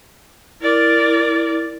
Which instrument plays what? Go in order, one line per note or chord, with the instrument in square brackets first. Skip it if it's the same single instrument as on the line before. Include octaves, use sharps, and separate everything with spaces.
[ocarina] E4 [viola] A#4 D5